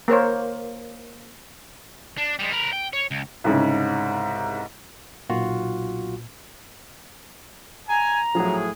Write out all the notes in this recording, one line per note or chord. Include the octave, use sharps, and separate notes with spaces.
A#3 A#4 C5 C#5
D4
G3 G#3
A#4 B4
G5
C#5
C#2
C2 G#2 C#3
B1 A#2 F4 F#4
G#5 A#5
A2 F3 F#3 G#4